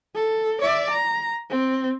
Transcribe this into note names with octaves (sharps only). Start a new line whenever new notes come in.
A4
D5 E5
A#5
C4